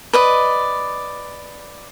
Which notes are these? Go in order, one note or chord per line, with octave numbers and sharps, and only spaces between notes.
B4 D5 D#5